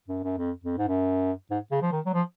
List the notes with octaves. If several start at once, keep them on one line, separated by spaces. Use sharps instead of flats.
F#2
F#2
F2
F2
G#2
F#2
G#2
C#3
F3
D#3
F#3
F3